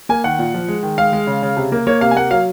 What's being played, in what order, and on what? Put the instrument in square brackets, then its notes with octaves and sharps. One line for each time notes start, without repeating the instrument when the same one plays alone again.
[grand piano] A#3 G#5
D#3 F#5
A#2
F3
G#3
D#3
G#3 F5
G#3
C#3
C#3
C3
A#3
A#3 C#5
C3 F5
G#5
A#3 F#5
F#3 F5